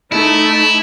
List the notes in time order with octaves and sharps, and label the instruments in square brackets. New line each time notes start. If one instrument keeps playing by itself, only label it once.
[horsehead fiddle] A3 D#4 [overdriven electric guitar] E4